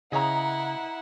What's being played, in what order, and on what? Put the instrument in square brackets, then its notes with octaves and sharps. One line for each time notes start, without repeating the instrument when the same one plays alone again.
[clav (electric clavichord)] C#3 G#4 C#5 [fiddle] E4 F#5 [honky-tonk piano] D#5 A#5